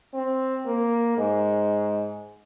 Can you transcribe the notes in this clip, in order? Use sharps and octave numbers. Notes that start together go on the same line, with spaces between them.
C4
A#3
G#2